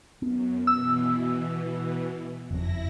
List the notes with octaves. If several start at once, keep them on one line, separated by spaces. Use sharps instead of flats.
F#2 B3
B2 E3 E6
F#1 F2 E4 A#6